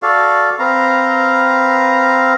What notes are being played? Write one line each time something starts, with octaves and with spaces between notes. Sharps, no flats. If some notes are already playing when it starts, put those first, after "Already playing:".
F#4 A4 D5 F5
C4 B4 F5 A#5